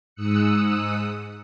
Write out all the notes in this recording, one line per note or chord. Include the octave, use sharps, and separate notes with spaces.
G#2 D#6 E6 F#6 C#7